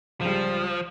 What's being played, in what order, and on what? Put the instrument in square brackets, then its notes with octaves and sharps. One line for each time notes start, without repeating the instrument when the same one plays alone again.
[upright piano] C#2 G3 [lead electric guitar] F3